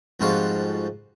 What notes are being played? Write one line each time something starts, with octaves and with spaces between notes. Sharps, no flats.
F2 G#2 G3 F4 F#4 F5